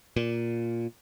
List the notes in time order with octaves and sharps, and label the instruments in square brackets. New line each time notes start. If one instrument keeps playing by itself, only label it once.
[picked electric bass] A#2